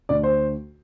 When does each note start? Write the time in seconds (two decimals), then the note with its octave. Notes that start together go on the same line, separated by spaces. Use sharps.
0.09 D2 D5
0.23 C5